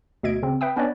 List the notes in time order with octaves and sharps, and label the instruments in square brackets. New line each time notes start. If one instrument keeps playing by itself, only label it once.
[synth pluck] D2 B2 D#5 E5 G#6 D7
C#3 C4
B4 E5 G5 D#6
B3 C#4 D4 B4 C#5 D5